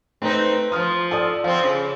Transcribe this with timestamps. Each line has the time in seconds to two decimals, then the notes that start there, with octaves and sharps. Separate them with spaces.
0.22 A3 C4 D#4 B4
0.72 F3 F4 D#6 F6
1.11 A4 D5 D#6
1.44 F3 C4 F5
1.63 C#3